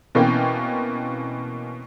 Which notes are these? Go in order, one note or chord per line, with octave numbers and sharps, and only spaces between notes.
B2 E3 A#3 C4 C#4 G5